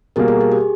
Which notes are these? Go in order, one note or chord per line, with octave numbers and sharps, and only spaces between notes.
B2 G3 A#3 G#4 A#4
G#4
G#4
G4